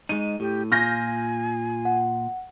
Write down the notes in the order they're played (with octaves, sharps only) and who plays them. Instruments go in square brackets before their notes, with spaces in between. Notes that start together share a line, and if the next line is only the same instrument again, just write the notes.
[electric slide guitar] G#3 D#4 [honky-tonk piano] D#7
[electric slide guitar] A2 [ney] G4
[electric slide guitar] A#2 F4 [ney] G#5 [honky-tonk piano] F6 G6 A#6
[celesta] F#5